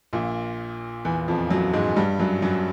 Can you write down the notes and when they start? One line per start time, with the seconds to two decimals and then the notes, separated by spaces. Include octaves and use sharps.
0.13 A#1 A#2
1.05 E2 E3
1.28 F2 F3
1.50 F#2 F#3
1.74 G#2 G#3
1.96 G2 G3
2.19 F#2 F#3
2.42 F#2 F#3